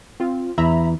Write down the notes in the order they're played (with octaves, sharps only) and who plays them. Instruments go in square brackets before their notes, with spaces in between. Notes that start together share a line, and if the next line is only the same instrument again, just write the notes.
[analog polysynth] C4 F4
[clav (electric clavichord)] E2 [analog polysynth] E5 A#5 B5